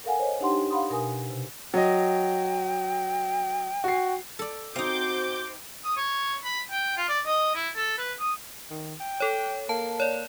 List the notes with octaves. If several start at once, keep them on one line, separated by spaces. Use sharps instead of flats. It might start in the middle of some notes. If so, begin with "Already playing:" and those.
A4 A#4 F5 F#5 G#5
A#4 C5 C#5 D#5
D4 D#4 G4 F#5 G5 C6
F5 F#5 B5 C6 D#6
B2 A#4 G#5 D#6
C3
F#3 D#5 G5
F#4 C7
A4 D5
C4 D#4 F#4 F5 D6 G6
D#6
C#5
B5
G5
F4
D5
D#5
E4
A4
B4
D#6
D#3
G5
A4 C#5
A#3 A5
C#5 D5